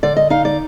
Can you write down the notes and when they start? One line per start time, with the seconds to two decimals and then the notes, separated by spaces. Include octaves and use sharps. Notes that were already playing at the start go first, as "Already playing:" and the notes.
0.03 D3 D5
0.16 D#5
0.30 D#4 F5
0.45 D5